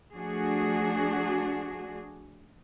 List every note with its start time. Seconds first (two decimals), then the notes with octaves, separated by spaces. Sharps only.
0.14 F3 A3 D4 F#4 G#4